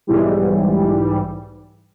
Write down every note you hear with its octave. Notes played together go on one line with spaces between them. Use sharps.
B1 G#2 E3 G3